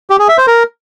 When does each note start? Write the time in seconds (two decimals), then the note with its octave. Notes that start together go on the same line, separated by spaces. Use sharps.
0.10 G4
0.19 G#4
0.29 E5
0.38 C5
0.47 A#4